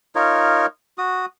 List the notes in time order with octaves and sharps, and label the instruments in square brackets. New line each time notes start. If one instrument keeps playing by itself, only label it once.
[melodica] D#4 F4 A#4 C#5
F#4 D#6